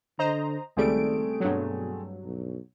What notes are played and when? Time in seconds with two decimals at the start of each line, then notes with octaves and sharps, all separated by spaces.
0.19 D3 C5 D#5 A#5
0.77 C#2 D#3 G3 A3 C4 G#4 D7
1.40 G2 B2 F#3
2.24 B1